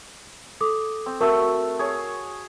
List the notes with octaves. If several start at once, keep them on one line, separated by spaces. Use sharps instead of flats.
A4 D6 D#6
C4
A3 F#4 A#4 E6
G#4 C#5